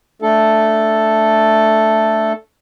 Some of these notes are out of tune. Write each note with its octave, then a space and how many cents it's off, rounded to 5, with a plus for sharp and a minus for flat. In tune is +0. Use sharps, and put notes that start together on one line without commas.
A3 +0 D4 +0 A4 +0